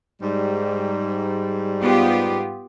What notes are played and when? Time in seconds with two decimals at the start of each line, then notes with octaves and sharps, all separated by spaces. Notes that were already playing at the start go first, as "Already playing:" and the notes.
0.21 G#2 G3
1.82 B3 F4 G4